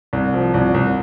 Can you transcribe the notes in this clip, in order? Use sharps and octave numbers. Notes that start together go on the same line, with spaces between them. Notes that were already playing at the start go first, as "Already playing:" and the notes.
C2
F3
C2
C2